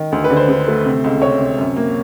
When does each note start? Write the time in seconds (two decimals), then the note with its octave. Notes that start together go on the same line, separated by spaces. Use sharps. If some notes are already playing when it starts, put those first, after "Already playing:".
Already playing: D#3
0.12 D2
0.24 B4
0.30 D3
0.36 C5
0.48 D3
0.67 A3
0.85 C3
1.04 C#2
1.22 C3 C#5
1.40 C3
1.58 F#2
1.76 A#3